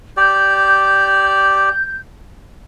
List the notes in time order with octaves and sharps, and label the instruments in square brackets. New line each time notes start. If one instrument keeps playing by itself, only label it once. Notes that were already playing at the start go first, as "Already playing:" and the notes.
[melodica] G4 D5 [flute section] G6